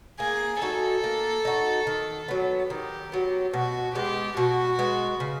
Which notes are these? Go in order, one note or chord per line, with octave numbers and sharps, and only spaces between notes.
A#3 G#4
D#4 F#4 A4
A#3
D#4 F#4
D#3
F#3 B3
D#3 G4
F#3 B3
B2 F#4
G#3 B3 G4
B2 F#4
G#3 B3
C#3